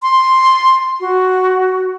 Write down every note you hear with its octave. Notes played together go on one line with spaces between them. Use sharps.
C6
F#4